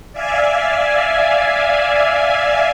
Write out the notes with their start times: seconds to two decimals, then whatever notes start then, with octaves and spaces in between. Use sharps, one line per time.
0.13 D5 E5 F5 G#5